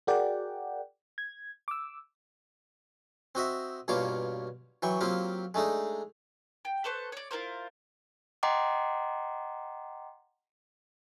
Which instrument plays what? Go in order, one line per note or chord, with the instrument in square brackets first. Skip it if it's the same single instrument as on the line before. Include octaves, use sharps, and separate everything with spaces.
[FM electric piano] F#4 G#4 A#4 D5 F#5 G5
G#6
D6 E6
[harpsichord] C4 F#4 D#5 E5
G2 B2 A#3 F4 C#5 D6
E3 F#3 G5 C#6
F#3 A#3 C4 F4 G4
G#3 A3 D4 D#4
[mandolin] G5
A4 B4 C5 C#6
C#5 D5
E4 F4 A#4 C5
[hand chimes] D#5 F#5 G5 A#5 C6 D6